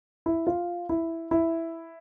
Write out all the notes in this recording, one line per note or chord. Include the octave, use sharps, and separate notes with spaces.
E4
F4
E4
E4